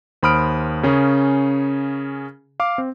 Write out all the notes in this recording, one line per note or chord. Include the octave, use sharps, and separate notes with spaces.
D#2 C5 B5 D#6 F6 D7
C#3 C#4 G#4 A#4
F5 D6
C4